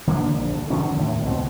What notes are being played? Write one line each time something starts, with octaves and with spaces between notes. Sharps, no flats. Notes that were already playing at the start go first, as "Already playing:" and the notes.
D3 A#3 B3 D4
A#1
D2
D3 D#3 F#3 C#4
D#2 A2
C#2 B2 G#3 C4